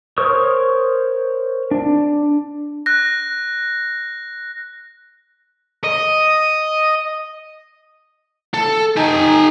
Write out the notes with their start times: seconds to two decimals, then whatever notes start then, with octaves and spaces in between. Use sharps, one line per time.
0.18 A#4 C5 C#5 C#6 D#6
1.71 D4
2.86 F#6 A#6
5.84 D#5
8.54 A4
8.97 D#4 G4 G#5